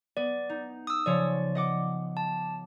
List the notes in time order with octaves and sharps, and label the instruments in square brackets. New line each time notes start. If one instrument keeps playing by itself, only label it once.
[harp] B3 [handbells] D5
[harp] D#4
[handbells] D#6 E6
[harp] C#3 F3 C#5 [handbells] D5
[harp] D#5 F#5 D6
[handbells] A5